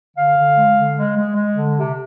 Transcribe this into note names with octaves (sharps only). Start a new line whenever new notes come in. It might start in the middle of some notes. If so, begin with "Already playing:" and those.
D3 F5
D3
G#3
D3
G#3
G#3
G#3
D3
C3